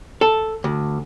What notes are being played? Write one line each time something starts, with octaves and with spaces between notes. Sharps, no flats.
A4
D2